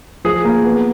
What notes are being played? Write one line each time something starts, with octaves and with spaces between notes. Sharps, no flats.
F3 G#4
A#3
B3